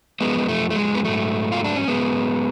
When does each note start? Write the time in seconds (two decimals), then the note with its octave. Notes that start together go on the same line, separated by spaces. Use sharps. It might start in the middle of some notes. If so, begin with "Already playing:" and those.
0.21 F#2 F3 G#3 B3
0.49 A3
0.70 A3
0.76 G#3
0.95 B3
1.04 G#2 F#3 A3
1.52 F4
1.64 D4
1.76 C#4
1.88 G#2 F#3 G#3 B3